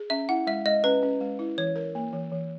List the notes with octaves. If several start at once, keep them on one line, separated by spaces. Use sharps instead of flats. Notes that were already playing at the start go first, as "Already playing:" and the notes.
Already playing: G#4
C#4 E5
E4 F#5
G#3 E5
G#3 D#5
C#4 B4
C#4
G#3
E4
E3 C#5
A#4
A#3
E3
E3